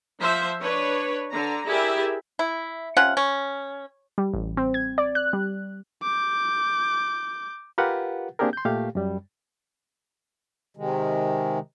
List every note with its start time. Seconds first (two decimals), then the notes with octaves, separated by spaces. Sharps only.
0.20 F3 C5 E5
0.60 D4 B4 C#5
1.30 D3 A#5
1.66 E4 G4 G#4 A#4 D5 E5
2.39 E4
2.97 C3 C#4 F4 F#5
3.17 C#4
4.18 G3
4.34 A1
4.57 C4
4.74 G#6
4.98 D5
5.15 F#6
5.33 G3
6.03 D6 G6
7.78 F4 G4 A#4 B4 F5 F#5
8.39 A#3 C4 D4 G4 G#4 A#4
8.53 C6 G6
8.65 A#2 A3 G4 F5
8.95 F#2 G3
10.77 C3 D#3 G#3